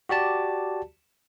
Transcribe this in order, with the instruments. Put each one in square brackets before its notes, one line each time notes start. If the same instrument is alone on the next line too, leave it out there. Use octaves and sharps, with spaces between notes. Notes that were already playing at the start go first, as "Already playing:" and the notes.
[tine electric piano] F#4 G4 D5 A5